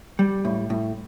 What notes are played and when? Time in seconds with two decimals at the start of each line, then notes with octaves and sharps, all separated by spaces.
0.19 G3
0.45 A2
0.70 A2